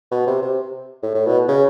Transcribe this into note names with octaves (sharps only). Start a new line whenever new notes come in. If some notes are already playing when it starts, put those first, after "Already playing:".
B2
C3
C3
A2
A2
B2
C#3